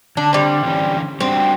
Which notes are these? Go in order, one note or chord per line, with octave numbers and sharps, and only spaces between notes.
D3 D4
G3 C4
D3 E3 C#4
G3 C4 D4 F#4